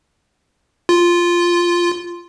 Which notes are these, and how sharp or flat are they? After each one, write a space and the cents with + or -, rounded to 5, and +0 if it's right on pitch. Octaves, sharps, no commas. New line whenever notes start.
F4 -5